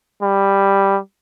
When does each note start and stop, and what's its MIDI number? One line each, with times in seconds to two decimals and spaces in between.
0.22 0.98 55